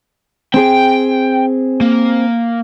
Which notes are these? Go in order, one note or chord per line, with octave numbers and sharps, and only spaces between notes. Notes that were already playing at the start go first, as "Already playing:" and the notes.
C4 G#4 G5
A#3